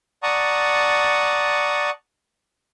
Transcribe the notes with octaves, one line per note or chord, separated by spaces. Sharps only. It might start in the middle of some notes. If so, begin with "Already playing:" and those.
D5 F#5 A5 A#5 C#6 D#6